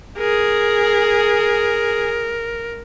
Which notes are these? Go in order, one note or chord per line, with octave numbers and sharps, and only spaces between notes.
G#4 A#4